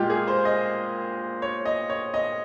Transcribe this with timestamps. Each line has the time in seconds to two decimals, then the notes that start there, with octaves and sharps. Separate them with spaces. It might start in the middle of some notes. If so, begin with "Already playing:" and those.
Already playing: A#2 G#3 F4 G4
0.10 G#4
0.28 C5
0.45 D#5
1.42 C#5
1.66 D#5
1.90 C#5
2.14 D#5